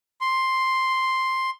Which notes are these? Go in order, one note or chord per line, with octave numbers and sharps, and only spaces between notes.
C6